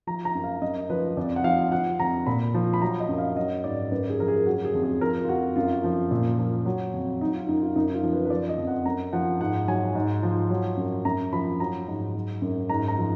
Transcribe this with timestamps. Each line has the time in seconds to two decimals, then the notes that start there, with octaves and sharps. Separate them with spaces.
0.07 F3 A#5
0.25 A#5
0.35 F#2
0.44 F5
0.61 F#2 D#5
0.90 F3 B4
1.17 F2 D5
1.36 F#5
1.44 F3 F5
1.72 F3 F#5
1.99 F2 A#5
2.26 A#2 B5
2.54 F3
2.74 B5
2.82 F#3 A#5
3.00 D#5
3.09 F#2
3.18 F5
3.36 F#3 D#5
3.64 G#2 D5
3.91 F#2 B4
4.10 G#4
4.19 F3 A#4
4.28 G#4
4.46 F#3 F#4
4.65 G#4
4.74 F2
4.83 G#4
5.01 F3 A#4
5.24 F4
5.29 F2 F#4
5.56 F#2 F4
5.84 F3
6.11 A#2
6.38 F3
6.66 F#3
6.93 F2
7.21 F#3 D#4
7.34 F4
7.48 F#2 D#4
7.62 F4
7.76 F#2 D#4
7.94 F4
8.03 F3
8.13 B4
8.25 B4
8.30 F3 D5
8.49 D#5
8.58 F2
8.67 F#5
8.85 F#2 A#5
9.13 F3 F#5
9.40 G#2 F#5
9.68 F#3 G#5
9.95 G#2
10.23 F3
10.50 F#3
10.77 F#2
11.05 F#2 A#5
11.33 F3 B5
11.60 F#3 A#5
11.88 G#2
12.15 F#3
12.42 F#2
12.69 G#2 A#5
12.88 A#5
12.98 F3